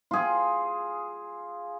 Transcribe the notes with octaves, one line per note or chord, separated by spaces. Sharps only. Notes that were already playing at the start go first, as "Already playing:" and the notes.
F4 G#4